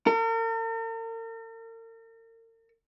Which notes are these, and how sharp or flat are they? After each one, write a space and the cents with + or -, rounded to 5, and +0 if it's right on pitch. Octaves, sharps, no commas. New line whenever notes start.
A#4 -45